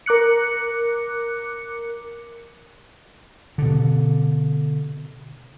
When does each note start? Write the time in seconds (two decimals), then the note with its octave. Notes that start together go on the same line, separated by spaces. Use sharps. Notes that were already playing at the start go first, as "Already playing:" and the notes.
0.06 A#4 D6 F#6 C#7
3.58 B2 D3